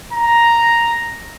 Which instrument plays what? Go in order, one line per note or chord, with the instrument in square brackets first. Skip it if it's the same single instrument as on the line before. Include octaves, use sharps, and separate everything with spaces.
[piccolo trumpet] A#5